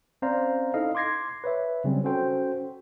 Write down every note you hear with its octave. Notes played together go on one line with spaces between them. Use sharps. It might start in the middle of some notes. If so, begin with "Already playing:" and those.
C4 C#4 C5 D5 F5 A#5
D#4 E4 A4 D#5 F5
C6 D6 G#6 A#6 C7
B4 C#5 E5
C#3 F#3 G3 C4 C#4
C#4 F#4 A4 C5 G5